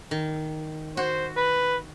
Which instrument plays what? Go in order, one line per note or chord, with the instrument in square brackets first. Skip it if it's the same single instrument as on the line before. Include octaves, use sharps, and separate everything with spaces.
[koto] D#3
[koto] F#4 [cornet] C5
[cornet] B4